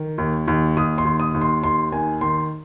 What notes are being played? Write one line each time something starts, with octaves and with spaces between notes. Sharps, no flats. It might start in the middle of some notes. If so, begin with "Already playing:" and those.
Already playing: D#3
D#2
D#2
D#2 D#6
C6
D#2
D#6
D#2
C6
D#2 C6
D#3 G#5
D#3 C6